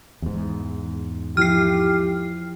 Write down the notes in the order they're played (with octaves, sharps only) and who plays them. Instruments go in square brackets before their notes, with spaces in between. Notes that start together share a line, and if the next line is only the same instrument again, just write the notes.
[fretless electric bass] E2 G#2
[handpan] F3 E4 F4 [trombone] G4 [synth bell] F6 C7